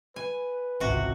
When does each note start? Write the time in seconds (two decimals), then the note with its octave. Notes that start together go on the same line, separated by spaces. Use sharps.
0.16 B4 G#5
0.80 G#1 C#2 C3 F#4